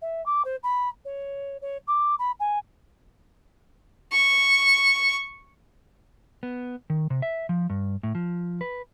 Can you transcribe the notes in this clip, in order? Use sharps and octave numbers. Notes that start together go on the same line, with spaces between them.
E5
D6
C5
B5
C#5
C#5
D6
B5
G#5
C#6
B3
D#3
C3
E5
F3
G2
A2
F3
B4